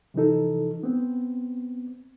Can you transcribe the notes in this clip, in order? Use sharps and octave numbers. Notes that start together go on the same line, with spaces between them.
C3 E3 F3 D#4 A4
B3 C4